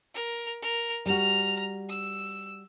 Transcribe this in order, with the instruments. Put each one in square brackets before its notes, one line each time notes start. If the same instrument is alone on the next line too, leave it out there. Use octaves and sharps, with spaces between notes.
[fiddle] A#4
A#4
[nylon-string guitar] G3 F#4 [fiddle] A#5 F6
[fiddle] E6